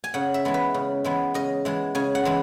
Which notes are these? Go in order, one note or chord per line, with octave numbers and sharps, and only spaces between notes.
G#5
C#3 F#5
E5
E3 G#3 B3
B4
C#3
E3 G#3 B3
C#3 D#5
E3 G#3 B3
C#3 G#5
F#5
E3 G#3 B3